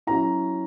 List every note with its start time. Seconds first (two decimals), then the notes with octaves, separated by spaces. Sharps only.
0.07 F#3 C#4 E4 A#5